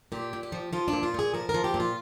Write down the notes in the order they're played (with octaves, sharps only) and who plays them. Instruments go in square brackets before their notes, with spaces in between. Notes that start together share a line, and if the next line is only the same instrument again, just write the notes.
[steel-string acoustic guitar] A#2 G4
A#2
G4
F3
F3 F4
D4
A#2
F4
A#2 G#4
F3 A#4
A#4
F3
G4
A#2
F4